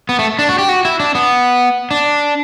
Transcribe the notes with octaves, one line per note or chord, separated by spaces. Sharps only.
B3
A3
D4
F#4
G4
F#4
E4
D4
B3
D4